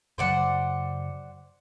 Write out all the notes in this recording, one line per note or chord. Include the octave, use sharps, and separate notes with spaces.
F#2 C#3 F#3 C5 D5 F#5